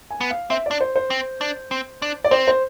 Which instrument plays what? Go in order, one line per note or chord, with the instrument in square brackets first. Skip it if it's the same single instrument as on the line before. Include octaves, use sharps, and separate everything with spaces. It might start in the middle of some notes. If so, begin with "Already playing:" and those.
[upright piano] G#5
[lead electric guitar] B3
[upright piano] F5
[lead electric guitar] C4 [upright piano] E5
[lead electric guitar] D4 [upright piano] D5
[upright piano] C5
C5
[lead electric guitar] C4
D4
C4
D4
[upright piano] D5
[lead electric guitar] C4 [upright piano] C5
[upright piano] C5